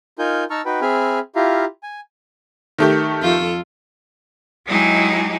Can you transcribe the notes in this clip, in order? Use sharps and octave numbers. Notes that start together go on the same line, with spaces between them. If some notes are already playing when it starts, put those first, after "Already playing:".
D#4 F4 A#4 G#5 G6
D#4 A5 A#5 C#6 E6 F6
D#4 F#4 B4 G5 B5
C4 G#4 E5 G#5 B5 F6
E4 F4 G4 E5 F5 A#5
G#5
D#3 A3 G4
F2 F4 A4
F#3 G#3 D#4 E4 G4 G#4